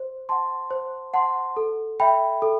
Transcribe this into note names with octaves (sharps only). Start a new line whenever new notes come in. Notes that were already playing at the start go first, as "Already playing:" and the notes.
Already playing: C5
F#5 A5 C6
C5
F#5 A5 C6
A4
E5 G5 B5
A4